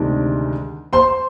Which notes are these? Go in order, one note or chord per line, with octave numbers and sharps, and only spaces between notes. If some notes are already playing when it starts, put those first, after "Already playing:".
Already playing: D2 C3 D#3 G#3 D4
C5 C6